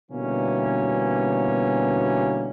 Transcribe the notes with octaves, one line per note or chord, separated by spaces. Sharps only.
B2 D3 E3 G3 A#3 C#4